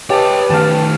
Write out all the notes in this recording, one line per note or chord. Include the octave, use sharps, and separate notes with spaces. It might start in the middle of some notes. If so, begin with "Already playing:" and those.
G4 B4 C#5 D#5 A5
D#3 A3 F5 A5